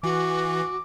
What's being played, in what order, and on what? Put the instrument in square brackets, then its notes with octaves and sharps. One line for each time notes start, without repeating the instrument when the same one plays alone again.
[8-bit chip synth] E3 [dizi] F#4 [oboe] D6